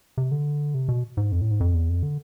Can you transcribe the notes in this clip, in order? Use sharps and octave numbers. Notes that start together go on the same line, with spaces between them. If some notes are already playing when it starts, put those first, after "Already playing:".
C3
D3
C3
B2
G#2
F2
A2
G#2
F2
E2
F2
D3